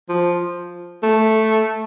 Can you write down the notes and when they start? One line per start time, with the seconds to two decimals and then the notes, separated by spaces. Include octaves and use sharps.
0.09 F3
1.03 A3